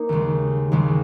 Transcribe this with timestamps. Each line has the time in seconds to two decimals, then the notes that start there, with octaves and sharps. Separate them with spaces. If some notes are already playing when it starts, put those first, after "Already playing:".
Already playing: A#3 D#4
0.09 D#2 C#3 G#3
0.72 D#2 C#3 G#3